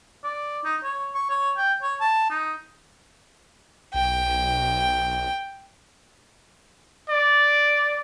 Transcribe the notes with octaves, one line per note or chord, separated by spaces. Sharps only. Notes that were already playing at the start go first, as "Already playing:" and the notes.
D5
D#4
C#5
C#6
C#5
G5
C#5
A5
D#4
B1 G5
D5